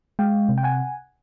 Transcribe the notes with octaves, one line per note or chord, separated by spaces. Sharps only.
G#3 F5 G5
C3
G5
F#5 G#5